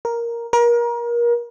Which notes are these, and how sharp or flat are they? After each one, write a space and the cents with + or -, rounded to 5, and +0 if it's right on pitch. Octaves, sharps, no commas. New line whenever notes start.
A#4 +5
A#4 +30